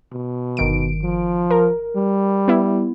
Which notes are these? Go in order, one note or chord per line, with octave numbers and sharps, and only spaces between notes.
B2
G1 D#3 D7
F3
A#4
G3
B3 E4